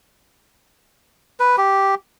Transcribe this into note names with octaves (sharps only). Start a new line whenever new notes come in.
B4
G4